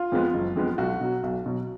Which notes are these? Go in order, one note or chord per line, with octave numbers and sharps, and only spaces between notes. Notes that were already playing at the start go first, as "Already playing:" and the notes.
Already playing: F4
F2 F3 G#3 B3
F#1
F2 F3 G#3 B3
B1 F#4
B2 F#3
B1
B2 F#3